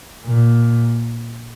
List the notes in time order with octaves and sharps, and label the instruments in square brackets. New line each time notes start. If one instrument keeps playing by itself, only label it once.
[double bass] A#2